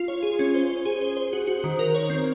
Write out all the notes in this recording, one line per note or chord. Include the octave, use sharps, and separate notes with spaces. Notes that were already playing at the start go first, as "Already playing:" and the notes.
Already playing: F4
C#5
G#4
C#4
C5
C5
G#4
C5
C5
F#4
F#4
D#3
A#4
C#5
C4